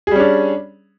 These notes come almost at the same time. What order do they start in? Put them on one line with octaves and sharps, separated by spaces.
G#4 G3 C#4 D4